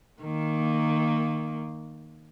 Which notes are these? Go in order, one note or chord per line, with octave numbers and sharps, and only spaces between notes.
D#3 A#3